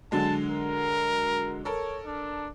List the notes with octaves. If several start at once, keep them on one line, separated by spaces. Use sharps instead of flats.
D3 F#3 G#3 A5
A#4
A4 A#4 C#5
D4